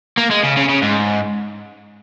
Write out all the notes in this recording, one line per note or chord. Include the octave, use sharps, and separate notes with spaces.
A#3
G#3
C#3
C#3
C#3
G#2